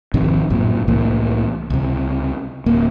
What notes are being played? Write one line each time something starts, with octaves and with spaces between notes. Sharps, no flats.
G#1 F2 C3 D#3
A1 F#2 A#2
C2 A2 E3 A#3
C#2 C3
D1 A#3